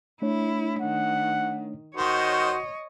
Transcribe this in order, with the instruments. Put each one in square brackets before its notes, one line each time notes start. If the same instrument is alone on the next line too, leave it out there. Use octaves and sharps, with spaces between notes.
[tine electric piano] A3 D4 C#5 [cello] E4
[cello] D#3 [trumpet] F#5
[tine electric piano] G#1 C6 [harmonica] D#3 C5 [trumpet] F#4 [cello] C#5 D#5